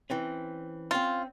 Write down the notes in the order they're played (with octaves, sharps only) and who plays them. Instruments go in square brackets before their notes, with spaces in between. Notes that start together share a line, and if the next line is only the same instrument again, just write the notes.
[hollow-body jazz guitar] E3 C4 C#4
[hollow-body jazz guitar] C4 C#4 [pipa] F4